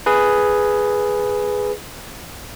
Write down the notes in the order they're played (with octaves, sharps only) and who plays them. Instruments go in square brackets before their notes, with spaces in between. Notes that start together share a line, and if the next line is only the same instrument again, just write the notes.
[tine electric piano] G#4 B4